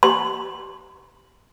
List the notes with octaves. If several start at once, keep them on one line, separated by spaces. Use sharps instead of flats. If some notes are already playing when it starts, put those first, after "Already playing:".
C6